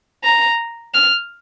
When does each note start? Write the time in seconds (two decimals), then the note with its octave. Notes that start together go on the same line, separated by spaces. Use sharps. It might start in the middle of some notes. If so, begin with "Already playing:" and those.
0.24 A#5
0.94 F6